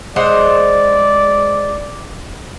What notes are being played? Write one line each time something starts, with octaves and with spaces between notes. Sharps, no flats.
G#3 C5 D5 F#5